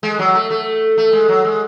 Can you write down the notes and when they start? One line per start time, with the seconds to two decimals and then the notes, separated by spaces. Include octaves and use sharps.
0.03 G#3
0.19 F#3
0.35 A3
0.50 A3
0.97 A3
1.13 G#3
1.29 F#3
1.45 G#3